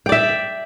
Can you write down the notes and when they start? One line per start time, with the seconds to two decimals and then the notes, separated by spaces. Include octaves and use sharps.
0.06 G5
0.09 D5
0.12 E5